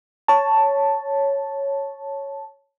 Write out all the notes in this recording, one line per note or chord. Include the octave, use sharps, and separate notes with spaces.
C#5 A5